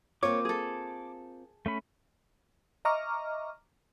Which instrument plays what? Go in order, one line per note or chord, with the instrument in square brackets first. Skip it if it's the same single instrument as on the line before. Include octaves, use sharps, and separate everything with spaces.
[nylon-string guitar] A#3 C4 F4 [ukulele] C#5 [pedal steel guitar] D6
[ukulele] G#4 A4
[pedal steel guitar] A3 C#4 B5
[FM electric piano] D#5 E5 A#5 C#6 D6 F6